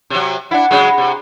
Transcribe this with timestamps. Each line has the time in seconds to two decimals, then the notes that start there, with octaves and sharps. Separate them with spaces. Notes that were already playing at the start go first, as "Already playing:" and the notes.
0.10 C3 F#3
0.51 D4 E4 F#5
0.71 C#3 F#3 G#3
0.98 C3